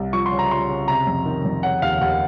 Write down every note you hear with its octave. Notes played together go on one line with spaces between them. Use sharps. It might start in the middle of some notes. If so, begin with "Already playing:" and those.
Already playing: C2
F3 C#6
C6
C#3
A#5
F3 C6
C#3
C3 A#5
F2
D#3
F2
C#3 F#5
D#2 F5
D#2 F#5